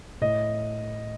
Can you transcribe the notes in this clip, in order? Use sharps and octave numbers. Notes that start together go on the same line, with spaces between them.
A2 D#5